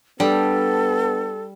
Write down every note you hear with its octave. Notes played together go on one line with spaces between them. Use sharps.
G3 B3 D4 A4